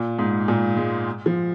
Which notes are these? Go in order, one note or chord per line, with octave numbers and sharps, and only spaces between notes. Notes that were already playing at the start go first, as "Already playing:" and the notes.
Already playing: A#2
G#2
A#2
G#3
F3